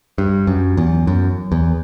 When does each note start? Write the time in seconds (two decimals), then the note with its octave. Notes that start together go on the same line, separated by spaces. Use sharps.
0.18 G2
0.47 F#2
0.77 E2
1.07 F#2
1.52 E2